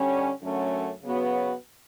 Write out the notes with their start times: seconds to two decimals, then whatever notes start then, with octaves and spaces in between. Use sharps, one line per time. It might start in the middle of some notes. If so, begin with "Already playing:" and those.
Already playing: D3 G3 C#4
0.42 F#2 D3 F#3 A3 C#4
1.03 C#3 F#3 B3 F#4